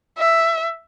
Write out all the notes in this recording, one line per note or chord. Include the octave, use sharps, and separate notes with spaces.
E5